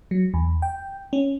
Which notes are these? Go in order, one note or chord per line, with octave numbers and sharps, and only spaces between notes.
F#3
E2
G5
C#4